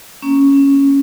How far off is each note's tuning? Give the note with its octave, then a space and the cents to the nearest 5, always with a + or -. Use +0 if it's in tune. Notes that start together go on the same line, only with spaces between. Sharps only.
A#3 +0 C#4 +0